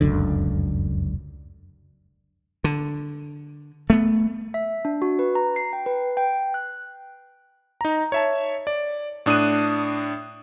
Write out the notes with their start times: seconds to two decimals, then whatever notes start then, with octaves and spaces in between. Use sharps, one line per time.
0.01 F1 C#2 F#2 D3
2.64 D3
3.90 A3 B3
4.54 E5
4.85 D4
5.02 F#4
5.19 B4
5.35 A#5
5.56 C7
5.73 G5
5.86 B4
6.17 G5
6.54 F#6
7.81 D#4 A#5
8.12 C#5 E5 A5
8.67 D5
9.26 A2 D4 D#6 F#6 D#7